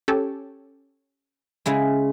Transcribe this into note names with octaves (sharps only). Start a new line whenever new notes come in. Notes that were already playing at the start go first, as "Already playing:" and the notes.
C#4 G4 A4
C#3 G#3 E4